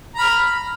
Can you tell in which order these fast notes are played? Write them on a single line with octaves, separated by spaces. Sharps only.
A#5 B5 F6